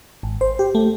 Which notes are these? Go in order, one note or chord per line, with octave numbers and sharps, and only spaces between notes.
G#1
C5
G4
A3